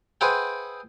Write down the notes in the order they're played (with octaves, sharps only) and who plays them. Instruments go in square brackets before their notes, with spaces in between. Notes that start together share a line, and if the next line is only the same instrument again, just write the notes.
[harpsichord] G#4 B4 C5 E5 F#5 G5